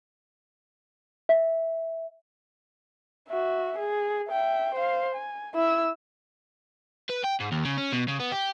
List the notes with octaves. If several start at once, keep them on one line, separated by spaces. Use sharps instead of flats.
E5
F#4 E5
G#4
E5 G5
C5 F5
G#5
E4 E6
B4
G5
G#2
D#2
C#3
C#4
B2
C#3
B3
G4